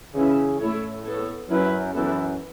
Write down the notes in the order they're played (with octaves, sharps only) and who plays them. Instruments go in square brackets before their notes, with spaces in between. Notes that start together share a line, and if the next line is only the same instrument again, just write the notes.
[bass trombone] C#3 [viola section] E3 C#4 E4
[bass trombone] A2 [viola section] A3 E4 A4 C#5
[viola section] B3 A4 C#5
[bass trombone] F#2 [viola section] F#3 C#4 E4 B4
[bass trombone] F#2 [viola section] E3 B3 E4 A4